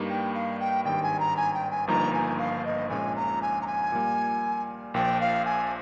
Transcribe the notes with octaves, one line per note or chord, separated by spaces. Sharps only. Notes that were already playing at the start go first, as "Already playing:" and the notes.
Already playing: G2 G3 A#3 D#4
G5
F5
G5
G#1 G2 D#3 G3 G5
G#5
A#5
G#5
G5
G#5
G1 G2 F3 A#3 D#4 A#5
G#5
F5
D#5
A#1 A#2 G#3 C#4 G#5
A#5
G#5
A#5
G#5
A#2 G3 A#3
A#1 A#2 F3 G5
F5
G#5